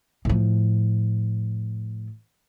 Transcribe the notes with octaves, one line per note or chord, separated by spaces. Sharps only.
A2 F3